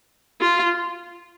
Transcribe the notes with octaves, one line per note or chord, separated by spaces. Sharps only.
F4